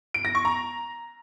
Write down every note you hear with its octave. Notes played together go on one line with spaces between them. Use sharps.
D7
A#6
C#6
A#5